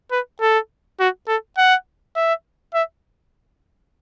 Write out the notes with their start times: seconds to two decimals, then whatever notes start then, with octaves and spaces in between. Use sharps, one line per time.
0.11 B4
0.41 A4
1.00 F#4
1.28 A4
1.57 F#5
2.16 E5
2.74 E5